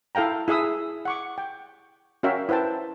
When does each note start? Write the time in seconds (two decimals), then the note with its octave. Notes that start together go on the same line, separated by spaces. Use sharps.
0.15 E4 A4 F5 G5 A#5
0.48 E4 G#4 E5 D#6 E6
1.05 F#5 C#6 D6
1.38 G5
2.23 C#4 F#4 A#4 E5 F5 G5
2.49 E4 B4 C5 G5 A5